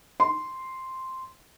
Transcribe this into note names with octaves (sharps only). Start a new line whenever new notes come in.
C6